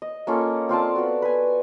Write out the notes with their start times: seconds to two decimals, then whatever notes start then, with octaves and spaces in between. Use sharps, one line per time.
0.02 D#5
0.27 A#3 C#4 F4 A4
0.69 C4 F4 D5 A5
0.96 B3 F#4
1.22 B4 G#5